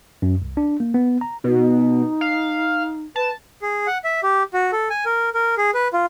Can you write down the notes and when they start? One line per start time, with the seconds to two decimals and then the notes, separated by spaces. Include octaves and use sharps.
0.22 F#2
0.42 C2
0.57 D4
0.80 A#3
0.94 B3
1.21 A#5
1.44 B2 D#4
2.21 F5
3.16 B4 A5
3.62 G#4
3.87 F#5
4.04 E5
4.23 G4
4.54 F#4
4.72 A4
4.90 G#5
5.06 A#4
5.34 A#4
5.58 G#4
5.74 B4
5.93 F4